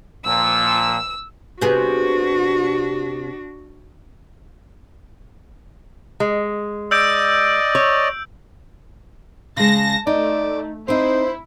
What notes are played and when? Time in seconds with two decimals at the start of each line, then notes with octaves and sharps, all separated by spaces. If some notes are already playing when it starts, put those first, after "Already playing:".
0.25 A#2 F3 E6
1.61 C3 B3 D4 F#4 G#4
6.20 G#3
6.91 D5 D#5 E6 G6 D7
7.75 C#5
9.57 C#3 G#3 A5 A#6
10.07 A3 D#4 D5
10.88 C4 D#4 E4 C5